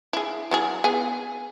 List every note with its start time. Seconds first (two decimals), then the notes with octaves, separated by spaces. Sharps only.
0.13 E4 G#4
0.51 F#3 E4 G#4
0.84 B3 G#4 G#5